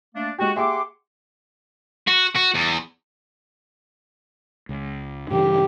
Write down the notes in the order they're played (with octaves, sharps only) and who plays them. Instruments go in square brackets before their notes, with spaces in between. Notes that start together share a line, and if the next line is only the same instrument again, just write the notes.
[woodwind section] A3 A#3 D4
[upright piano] G#3 G4 [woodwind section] F#4
[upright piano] G4 G#4 E5 [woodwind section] F#5 C6 D6
[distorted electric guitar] F#4
F#4
E2
[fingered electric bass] C#2
[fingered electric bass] G2 C#3 E3 [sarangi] G4